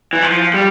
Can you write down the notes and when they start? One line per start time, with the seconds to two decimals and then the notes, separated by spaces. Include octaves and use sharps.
0.13 E3
0.22 F3
0.54 G3